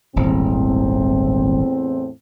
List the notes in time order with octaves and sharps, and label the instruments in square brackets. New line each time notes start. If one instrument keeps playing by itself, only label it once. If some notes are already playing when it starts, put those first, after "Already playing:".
[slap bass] D#1 G#1 [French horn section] E2 A2 C4